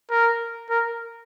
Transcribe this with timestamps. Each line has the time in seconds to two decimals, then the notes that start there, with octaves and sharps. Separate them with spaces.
0.10 A#4
0.70 A#4